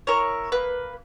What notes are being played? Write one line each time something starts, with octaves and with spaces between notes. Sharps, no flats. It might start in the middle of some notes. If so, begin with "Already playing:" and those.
E4 A#4 C#5
A#3 B4